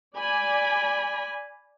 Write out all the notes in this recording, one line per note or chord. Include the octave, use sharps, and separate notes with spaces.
D5 G#5 B5